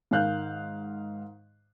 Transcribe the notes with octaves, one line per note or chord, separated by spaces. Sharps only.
G#2 D#3 F5 F#6 G6